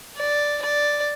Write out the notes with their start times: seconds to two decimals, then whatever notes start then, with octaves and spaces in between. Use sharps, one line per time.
0.17 D5
0.62 D5